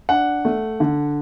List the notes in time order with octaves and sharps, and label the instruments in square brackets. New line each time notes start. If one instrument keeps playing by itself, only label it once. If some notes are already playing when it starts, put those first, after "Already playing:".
[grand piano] D4 F#5
A3
D3